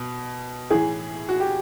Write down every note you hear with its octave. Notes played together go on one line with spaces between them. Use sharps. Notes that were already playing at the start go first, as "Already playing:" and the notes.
Already playing: B2
A2 E3 G#4
F#4
G4